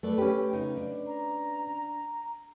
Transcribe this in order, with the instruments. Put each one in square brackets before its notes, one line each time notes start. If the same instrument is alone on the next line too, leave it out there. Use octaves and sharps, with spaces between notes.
[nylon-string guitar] A3 B4 D5
[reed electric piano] C#4 B4 [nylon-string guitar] G4
[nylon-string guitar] C#3 D#4
D4
[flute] A#5